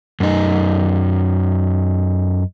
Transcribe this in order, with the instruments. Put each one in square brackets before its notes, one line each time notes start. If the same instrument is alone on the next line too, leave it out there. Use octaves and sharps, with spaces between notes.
[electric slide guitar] F#2 D#4